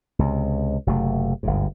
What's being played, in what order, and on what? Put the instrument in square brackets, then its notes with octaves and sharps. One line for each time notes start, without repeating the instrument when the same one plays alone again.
[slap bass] C#2 C3
F#1 C3 A3
G1 D2 G#2